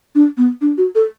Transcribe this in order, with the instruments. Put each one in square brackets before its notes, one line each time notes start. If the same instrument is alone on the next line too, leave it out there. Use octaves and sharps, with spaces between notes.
[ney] D4
B3
D4
F#4
A4